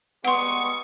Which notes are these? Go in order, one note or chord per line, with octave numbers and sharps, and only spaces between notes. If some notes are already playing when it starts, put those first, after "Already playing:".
G3 G#3 B3 F#5 C6 C#6 D#6